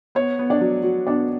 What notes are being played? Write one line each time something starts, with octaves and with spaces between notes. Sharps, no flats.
B3 C#5
B3
D4 D5
F#3
F#3
B3 D4 D5